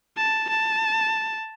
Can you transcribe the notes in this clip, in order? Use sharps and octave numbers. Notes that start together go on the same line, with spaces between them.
A5
A5